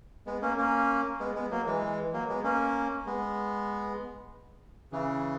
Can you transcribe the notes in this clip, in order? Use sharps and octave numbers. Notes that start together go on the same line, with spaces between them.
G#3 B3
A#3 C#4
A#3 C#4
G#3 B3
G#3 B3
F#3 A#3
E3 G#3
F#3 A#3
G#3 B3
A#3 C#4
G#3 B3
C#3 E3